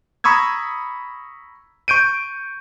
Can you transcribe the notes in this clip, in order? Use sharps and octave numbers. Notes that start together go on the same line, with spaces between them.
A#5 B5 C#6 D#6 E6 G#6
C#6 G6 D7 D#7